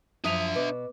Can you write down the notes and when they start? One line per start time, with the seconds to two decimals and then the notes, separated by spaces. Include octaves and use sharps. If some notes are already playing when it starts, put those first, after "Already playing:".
0.24 F#2 F3 D4 E5 D#6 D#7 F7
0.55 B2 B4 D6